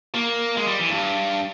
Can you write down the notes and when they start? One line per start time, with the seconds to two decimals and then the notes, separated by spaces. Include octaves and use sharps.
0.15 A#3
0.57 G#3
0.67 G3
0.79 E3
0.90 G2